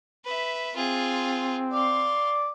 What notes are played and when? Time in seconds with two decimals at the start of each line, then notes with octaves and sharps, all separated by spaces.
0.25 B4 E5
0.76 C4 F4 G#4
1.73 D5 F5 C6